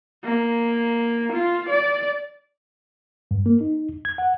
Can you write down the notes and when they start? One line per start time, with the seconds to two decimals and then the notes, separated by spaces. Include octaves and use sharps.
0.24 A#3
1.33 F4
1.69 D5
3.31 G2
3.46 A#3
3.61 D#4
4.05 G#6
4.18 F#5